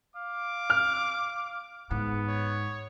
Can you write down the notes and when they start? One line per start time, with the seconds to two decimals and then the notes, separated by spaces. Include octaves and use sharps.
0.16 F5 D6
0.70 F6
1.91 G#2 B3
2.28 C#5